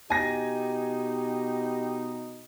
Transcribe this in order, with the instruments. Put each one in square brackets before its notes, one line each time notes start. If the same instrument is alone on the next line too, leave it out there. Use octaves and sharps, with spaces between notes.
[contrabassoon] B2 [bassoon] D#4 [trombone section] G4 [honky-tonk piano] G#5 A#6